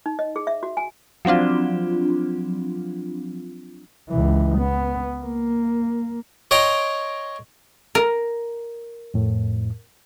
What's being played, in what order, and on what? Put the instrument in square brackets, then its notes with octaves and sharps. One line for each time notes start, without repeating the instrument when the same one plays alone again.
[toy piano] D#4
D#5
G#4
E5
F#4
G#5
[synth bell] F3 F#3 C4 D4 F4
[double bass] C#2 E3
B3
A#3
[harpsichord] C#5 D#5 G5 A#5 C6
[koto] A#4
[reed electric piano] F2 A2